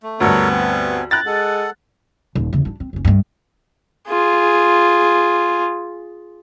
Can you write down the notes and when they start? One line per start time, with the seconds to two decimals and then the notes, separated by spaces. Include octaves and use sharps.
0.03 A3
0.20 D2 G2 B3 A4 A#4 C#5
0.50 C4 G#5
1.11 E4 G5 A#5 F#6 A6
1.26 G#3 A4 F#5
2.35 D#1
2.53 E2 C#3
2.65 D4 E4
2.80 C4
2.93 F#1 C#4
3.05 G2 A3
4.08 F4 G#4